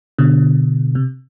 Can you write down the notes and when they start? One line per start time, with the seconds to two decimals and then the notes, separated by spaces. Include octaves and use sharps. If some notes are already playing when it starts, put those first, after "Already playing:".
0.18 B2 D3
0.95 C3